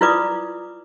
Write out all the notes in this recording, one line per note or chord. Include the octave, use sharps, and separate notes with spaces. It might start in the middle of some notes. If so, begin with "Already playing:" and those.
E4 F4 B4 D5 D6 D#6